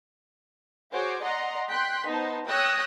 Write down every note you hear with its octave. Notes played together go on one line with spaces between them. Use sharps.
F#4 G#4 C5 C#5 D6
D5 D#5 F#5 A#5 C6
G5 C6 F#6 B6
B3 D#4 C5 A5
C#5 G5 D#6 E6 F#6 A#6